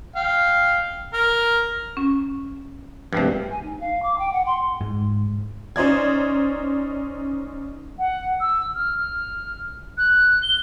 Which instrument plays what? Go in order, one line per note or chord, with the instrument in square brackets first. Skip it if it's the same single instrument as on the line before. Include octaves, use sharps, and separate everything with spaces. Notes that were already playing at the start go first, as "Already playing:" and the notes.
[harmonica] F5 G5
[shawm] A#4
[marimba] C#4
[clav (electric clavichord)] G2 C3 [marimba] F3 G3 A3
[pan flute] G#5
D#4
F5
D6
G5
F#5
C6
[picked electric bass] G#2
[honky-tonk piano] C#4 D#4 C5 D5 G#6
[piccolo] F#5
E6
F6
F#6
G7